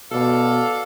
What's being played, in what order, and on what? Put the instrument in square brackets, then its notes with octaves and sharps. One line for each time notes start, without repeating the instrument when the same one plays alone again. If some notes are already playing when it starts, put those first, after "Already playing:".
[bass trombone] B2 [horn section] A4 D5 F5